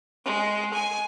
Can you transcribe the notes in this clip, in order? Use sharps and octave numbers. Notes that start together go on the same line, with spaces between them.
G#3
G#5